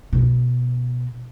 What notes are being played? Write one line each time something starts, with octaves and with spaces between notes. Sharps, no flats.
B2